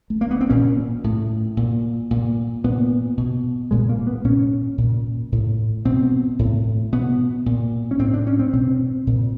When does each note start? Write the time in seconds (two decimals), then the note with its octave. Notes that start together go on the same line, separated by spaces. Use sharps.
0.10 A3
0.21 A#3
0.31 B3
0.41 C4
0.49 A#2 C#4
1.04 A2
1.57 A#2
2.11 A#2
2.64 A#2 B3
3.17 B2
3.71 A#2 G#3
3.89 A#3
4.07 B3
4.24 A#2 C#4
4.78 A#2
5.32 A2
5.85 B2 C4
6.39 A2
6.92 B2 B3
7.46 A#2
7.91 C#4
7.99 A2 C4
8.14 D4
8.27 C#4
8.39 C4
8.53 B2 C4
9.07 A#2